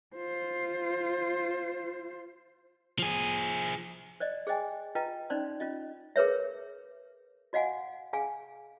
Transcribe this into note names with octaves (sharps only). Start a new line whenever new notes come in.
F4 C5
F3 G#4
C5 D5 D#5
G#4 C5 D#5 G5 G#5
F4 B4 D#5 G5 A#5
C#4 D#4 C5 D5 B5 C6
C#4 F4 D#5
G#4 A#4 B4 C#5 E5
F#4 D#5 F5 F#5 G#5
G#4 F5 G#5